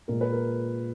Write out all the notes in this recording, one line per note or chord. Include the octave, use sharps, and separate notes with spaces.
A#2 G#3 A#4
B4
A#4